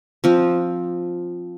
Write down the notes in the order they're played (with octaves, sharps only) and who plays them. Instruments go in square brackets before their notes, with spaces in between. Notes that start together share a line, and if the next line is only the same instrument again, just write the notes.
[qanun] F3 C4